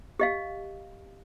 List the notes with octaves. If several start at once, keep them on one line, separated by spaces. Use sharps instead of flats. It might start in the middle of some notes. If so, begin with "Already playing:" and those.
G4 D#5 F5